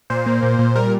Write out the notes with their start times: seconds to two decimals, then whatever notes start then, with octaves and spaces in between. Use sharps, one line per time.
0.10 A#2 C5
0.26 A#3
0.43 A#2
0.59 A#2
0.75 G3 A#4